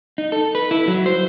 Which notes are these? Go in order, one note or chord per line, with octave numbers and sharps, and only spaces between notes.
D#4
A4
B4
E4
F#3
C5